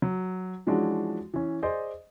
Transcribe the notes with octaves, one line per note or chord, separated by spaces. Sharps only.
F#3
E3 F3 G#3 C#4 D4 F#4
E3 C#4
G#4 C5 D5 D#5